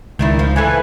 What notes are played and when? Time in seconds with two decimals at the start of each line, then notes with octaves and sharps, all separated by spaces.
0.19 C#2 D#3 D4 E4
0.39 F3
0.56 E3 E4 A4 B4 G#5